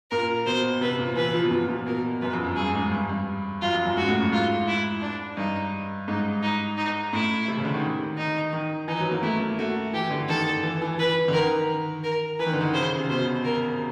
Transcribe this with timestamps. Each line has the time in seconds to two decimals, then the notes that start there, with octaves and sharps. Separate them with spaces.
0.11 A#2 A#4
0.46 B2 C5
0.81 C3 B4
0.99 A#2
1.16 E3 B4
1.34 F3
1.43 B2
1.51 A#2
1.69 A#2
1.86 B2 A#4
2.21 F#2 B4
2.33 F2
2.45 F#2
2.56 G2 G#4
2.74 G#2
2.92 G2
3.09 G2
3.62 F#2 F4
3.73 F2
3.86 F#2
3.97 G#2 F#4
4.08 A2
4.21 A2
4.32 G#2 F4
4.68 E4
5.02 D4
5.37 G2 D#4
6.08 G#2 D#4
6.43 D#4
6.77 D#4
7.13 A2 E4
7.48 C3
7.57 C#3
7.65 D3
7.74 D#3
8.17 D#4
8.53 D#3
8.88 E3 D#4
9.00 F#3
9.11 A#3
9.23 A3 E4
9.40 A#3
9.58 A3 F#4
9.93 E3 G4
10.11 D3
10.28 D#3 A4
10.63 E3
10.82 E3
10.98 E3 B4
11.28 D3
11.33 D#3 A#4
12.03 A#4
12.39 E3 B4
12.47 D#3
12.53 D3
12.61 D#3
12.74 C#3 C5
12.98 C3
13.09 B2 C5
13.45 A#4